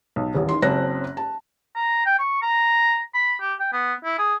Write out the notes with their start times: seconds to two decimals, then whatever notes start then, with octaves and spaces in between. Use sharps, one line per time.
0.16 B1
0.34 D#1 A1
0.49 D#3 C6
0.62 F#1 F#2 C4 C#4 F#6 A#6
1.17 A5
1.76 A#5
2.06 G5
2.19 C#6
2.43 A#5
3.15 B5
3.41 G4
3.60 G5
3.73 B3
4.04 E4
4.19 G#4